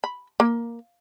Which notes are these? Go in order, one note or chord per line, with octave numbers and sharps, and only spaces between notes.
B5
A#3